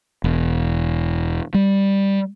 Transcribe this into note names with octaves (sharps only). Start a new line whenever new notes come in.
E1
G3